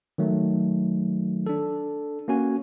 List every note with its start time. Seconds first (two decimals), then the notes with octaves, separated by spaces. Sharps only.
0.18 D#3 F#3 A3
1.46 D4 A4
2.28 A#3 C#4 F#4 G#5